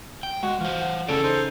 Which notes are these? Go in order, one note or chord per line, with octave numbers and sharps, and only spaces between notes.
G5
G#3 F#4 F#5
E3 F4 C5
F#5
C#3 E3 C#4 E4 A4 D5 D7
D#4 C5